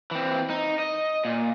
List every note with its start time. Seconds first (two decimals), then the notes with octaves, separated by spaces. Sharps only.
0.11 E3 C4
0.50 D#4
0.79 D#5
1.25 A#2